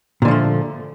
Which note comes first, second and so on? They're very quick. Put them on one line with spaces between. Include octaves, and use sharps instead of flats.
A#2 D3 F3 A3